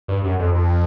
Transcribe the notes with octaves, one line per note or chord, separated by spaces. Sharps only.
G2
F#2
F2
F2